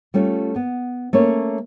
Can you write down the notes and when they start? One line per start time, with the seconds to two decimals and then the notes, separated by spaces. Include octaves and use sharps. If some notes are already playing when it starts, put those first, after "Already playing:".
0.14 G3 A3 C#4 F4
0.56 B3
1.13 A3 A#3 C#4 C#5